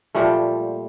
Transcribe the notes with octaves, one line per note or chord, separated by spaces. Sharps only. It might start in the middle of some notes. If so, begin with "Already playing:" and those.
A#2 F3 G3 A3